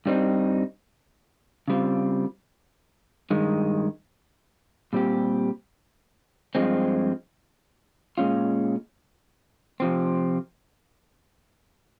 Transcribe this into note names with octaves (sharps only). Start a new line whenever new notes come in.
G2 G3 C4 D#4
C#3 G3 C4 F4
G2 D#3 G#3
A#2 G3 C4 G4
G2 F3 G#3 C4
A#2 G#3 C#4 F4
F2 C3 F3 C4